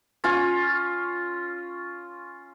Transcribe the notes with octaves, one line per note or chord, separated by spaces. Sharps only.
C#4 F4